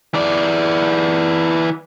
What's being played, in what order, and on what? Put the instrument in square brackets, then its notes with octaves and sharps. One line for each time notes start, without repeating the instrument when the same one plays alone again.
[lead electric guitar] E3 D5